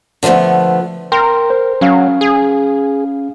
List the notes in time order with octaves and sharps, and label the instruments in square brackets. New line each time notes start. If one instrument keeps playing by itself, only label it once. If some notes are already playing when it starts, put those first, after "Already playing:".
[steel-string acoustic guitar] D3 F3 G#3 A3 B3
[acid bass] A#4 [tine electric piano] G5 C6
[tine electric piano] C5
[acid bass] F#3 [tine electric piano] C#4 F5
[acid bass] G#4